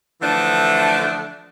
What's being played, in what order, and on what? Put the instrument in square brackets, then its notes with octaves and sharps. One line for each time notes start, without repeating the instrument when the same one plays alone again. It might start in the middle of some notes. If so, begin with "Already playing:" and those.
[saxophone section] D3 E3 F3 A3 D4